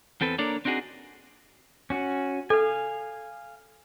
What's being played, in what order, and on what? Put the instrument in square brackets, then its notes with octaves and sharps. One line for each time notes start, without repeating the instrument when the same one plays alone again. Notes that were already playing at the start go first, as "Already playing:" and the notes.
[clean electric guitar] E2 C4 A4 B4
A#3 D4 A4 A#4 C#5 D5
C4 D4 D#4 F#4 G#4
[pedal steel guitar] C#4 F#4
[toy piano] A4 [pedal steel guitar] F5 G#5